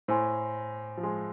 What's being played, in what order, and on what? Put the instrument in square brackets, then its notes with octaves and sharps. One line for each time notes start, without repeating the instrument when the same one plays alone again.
[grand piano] A2 [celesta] C5 G#5 C6
[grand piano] F3
[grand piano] G#3 [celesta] C5 G#5 C6